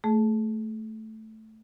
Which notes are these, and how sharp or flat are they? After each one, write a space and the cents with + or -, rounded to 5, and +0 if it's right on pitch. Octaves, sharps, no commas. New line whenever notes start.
A3 +0 G#4 +30